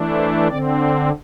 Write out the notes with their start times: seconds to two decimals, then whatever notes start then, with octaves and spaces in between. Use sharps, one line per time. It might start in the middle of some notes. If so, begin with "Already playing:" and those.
Already playing: E3 A3 D4
0.15 C5
0.48 D3 C4 D5
0.80 C5